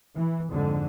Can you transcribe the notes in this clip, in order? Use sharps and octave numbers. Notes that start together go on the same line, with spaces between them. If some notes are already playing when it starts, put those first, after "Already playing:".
E3
F2 G#2 D3